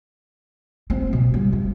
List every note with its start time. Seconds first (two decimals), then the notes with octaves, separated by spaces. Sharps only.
0.90 C4
1.13 B2
1.34 G3
1.53 B3